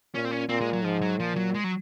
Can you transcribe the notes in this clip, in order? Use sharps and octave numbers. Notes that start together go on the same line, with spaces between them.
A#2 C#4
C4
C#4
A#2 C4
G#3
F#3
G#2 F3
F#3
A#2 F3
F#3
G#3
F#3